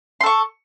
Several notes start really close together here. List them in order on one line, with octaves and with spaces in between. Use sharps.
C6 A4 C#6